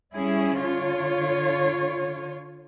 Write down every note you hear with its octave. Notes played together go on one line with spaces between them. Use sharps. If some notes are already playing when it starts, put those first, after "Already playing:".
G3 C#4 E4 G#4
D3 F4 C#5